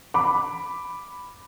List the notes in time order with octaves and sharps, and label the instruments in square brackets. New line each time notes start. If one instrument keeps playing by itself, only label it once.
[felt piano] B5 D6